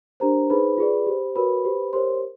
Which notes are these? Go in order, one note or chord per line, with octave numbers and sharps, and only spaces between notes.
D4 G4 A#4 C5 A#5
D#4 G#4 B4 C5 B5
F4 G#4 B4 D5
G4 C5
F#4 A#4 B4 C#5 B5
G4 C5
G4 A#4 C5 C#5 C6